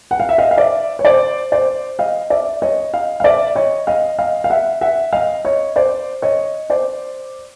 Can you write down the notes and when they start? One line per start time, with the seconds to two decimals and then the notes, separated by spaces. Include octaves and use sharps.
0.11 F#5
0.20 F5
0.29 E5
0.38 D#5 F5
0.51 F5
0.58 D5 E5
0.99 C#5
1.05 C5 D5
1.52 C5 D5
1.99 D#5 F5
2.30 D5 E5
2.62 C#5 D#5
2.94 D#5 F5
3.20 F5
3.24 D5 E5
3.56 C#5 D#5
3.87 D#5 F5
4.19 D#5 F5
4.44 F5
4.50 E5 F#5
4.81 E5 F#5
5.13 D#5 F5
5.45 C#5 D#5
5.76 C5 D5
6.22 C#5 D#5
6.70 C5 D5